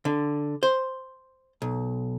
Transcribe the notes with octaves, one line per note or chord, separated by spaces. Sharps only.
D3
C5
B1